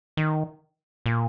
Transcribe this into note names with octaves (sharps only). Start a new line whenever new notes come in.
D#3
A#2